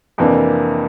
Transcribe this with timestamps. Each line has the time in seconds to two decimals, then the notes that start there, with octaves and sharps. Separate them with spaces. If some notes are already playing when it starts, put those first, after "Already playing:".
0.18 F2 C3 E3 A#3 D4